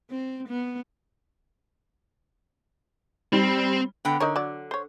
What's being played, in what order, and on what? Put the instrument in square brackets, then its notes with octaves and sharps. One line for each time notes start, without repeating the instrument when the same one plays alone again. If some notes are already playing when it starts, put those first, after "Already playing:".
[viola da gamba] C4
B3
[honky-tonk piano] G3 [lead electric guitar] C4
[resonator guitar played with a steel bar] D3 B3 G5
[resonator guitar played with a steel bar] D3 [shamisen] D#4 A#4 C#5
[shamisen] F#3 D5
C5 C#5